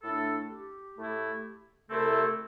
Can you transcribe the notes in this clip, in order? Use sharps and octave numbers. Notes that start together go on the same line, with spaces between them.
A2 A3 D4 A4
G4
A2 A3 E4
C2 C3 A3 C4 E4 A4